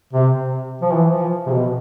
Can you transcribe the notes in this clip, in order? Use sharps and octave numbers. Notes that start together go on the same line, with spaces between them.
C3
F3
E3
F3
C3
B2